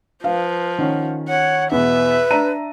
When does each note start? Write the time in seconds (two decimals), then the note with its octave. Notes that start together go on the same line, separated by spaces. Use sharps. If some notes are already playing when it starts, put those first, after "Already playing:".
0.24 F3 B4 F5
0.78 D#3 C#4 F#5
1.29 C#5 F#5
1.71 E2 B2 B4 E5
2.31 D4 A#5 D#7